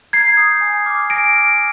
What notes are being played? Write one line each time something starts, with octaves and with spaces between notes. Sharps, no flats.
A#5 G#6 C7
D#6 G6
G#5
D6 F6
G#5 A#6 D7
D6 F6